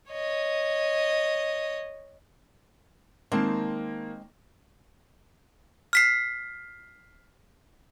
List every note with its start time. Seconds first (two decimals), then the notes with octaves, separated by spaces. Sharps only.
0.11 C#5 D#5
3.32 D#3 G#3 A#3 C4 A5
5.93 F6 B6 C7